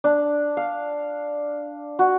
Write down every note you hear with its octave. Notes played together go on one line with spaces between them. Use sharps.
D4
F5
F#4